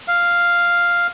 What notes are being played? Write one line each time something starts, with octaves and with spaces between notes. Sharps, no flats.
F5